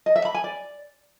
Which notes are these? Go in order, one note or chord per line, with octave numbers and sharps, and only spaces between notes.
D#5
E5
B5
G#5
D5